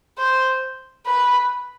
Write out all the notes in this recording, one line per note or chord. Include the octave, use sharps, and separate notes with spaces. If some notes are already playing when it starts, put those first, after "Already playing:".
C5
B4